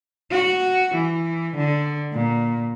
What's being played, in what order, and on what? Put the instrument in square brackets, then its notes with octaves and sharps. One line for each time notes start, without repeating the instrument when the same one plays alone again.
[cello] F#4
E3
D3
A#2